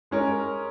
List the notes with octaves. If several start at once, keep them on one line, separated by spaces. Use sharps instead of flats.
G#3 C#4 A#4